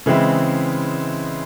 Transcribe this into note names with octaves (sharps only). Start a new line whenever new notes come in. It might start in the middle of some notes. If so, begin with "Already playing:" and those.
C#3 E3 G#3 C4 E4